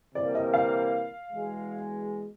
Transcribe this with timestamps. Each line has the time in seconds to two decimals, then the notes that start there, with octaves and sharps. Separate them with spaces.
0.15 C3 E3 G3 A#3 D5
0.35 D#5
0.54 F5
1.31 E2 B2 G#3